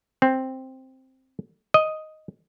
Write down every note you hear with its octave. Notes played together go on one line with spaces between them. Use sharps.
C4
D#5